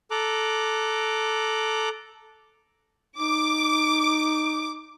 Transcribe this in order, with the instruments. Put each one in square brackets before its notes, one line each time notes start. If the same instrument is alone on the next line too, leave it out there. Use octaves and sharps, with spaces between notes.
[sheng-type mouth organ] A4 A#5 D6 F#6
[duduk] D#4 [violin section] D6